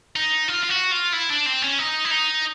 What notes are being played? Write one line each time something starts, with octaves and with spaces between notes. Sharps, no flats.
D#4
F4
F4
F#4
F4
E4
D4
C4
C#4
D#4
E4
D#4